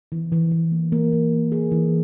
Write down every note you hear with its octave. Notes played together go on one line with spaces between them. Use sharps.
E3
E3
E3
A#3
A#3
E3
E3
G#4
E3